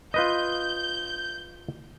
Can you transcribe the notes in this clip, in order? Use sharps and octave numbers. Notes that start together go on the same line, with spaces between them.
F4 B4 D#5 G6